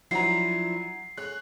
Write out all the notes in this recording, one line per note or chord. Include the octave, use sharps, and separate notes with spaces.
F3 F#3 D4 E4 A#5 C7
G#4 C#5 F#6